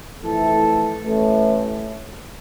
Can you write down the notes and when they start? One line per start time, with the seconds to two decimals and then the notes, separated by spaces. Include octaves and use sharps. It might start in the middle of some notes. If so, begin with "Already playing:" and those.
0.21 F2 E3 A3 E4 A4
1.01 A1 A2 E3 A3